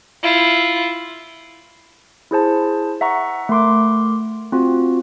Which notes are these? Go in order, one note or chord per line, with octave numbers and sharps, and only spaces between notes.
E4 F4
E4 G#4 C5 A5
E5 F#5 A#5 C#6
A3 A#4 C6 D6
C4 F4 F#4